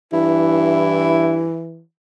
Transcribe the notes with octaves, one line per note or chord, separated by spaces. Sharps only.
G2 E3 E4